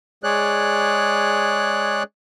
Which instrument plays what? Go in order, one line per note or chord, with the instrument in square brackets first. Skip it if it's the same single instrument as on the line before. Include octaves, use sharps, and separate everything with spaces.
[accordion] G#3 G#4 C#5 D5 F#6